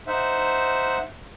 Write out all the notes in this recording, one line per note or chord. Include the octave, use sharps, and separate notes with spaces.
D#4 C5 E5 F#5